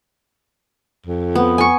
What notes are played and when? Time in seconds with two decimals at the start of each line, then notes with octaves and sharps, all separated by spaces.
1.06 F2
1.35 B3
1.58 G#5 C#6